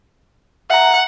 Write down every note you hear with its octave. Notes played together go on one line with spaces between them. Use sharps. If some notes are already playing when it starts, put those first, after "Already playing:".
E5 F#5 A#5